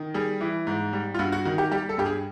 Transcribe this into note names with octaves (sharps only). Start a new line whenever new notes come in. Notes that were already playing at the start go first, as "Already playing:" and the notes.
Already playing: D#3
G3 G#4
E3
G#2
G3
F4
G2 F#4
F#4
D#3 F#4
G4
G3 G4
A4
G2 G4
G#4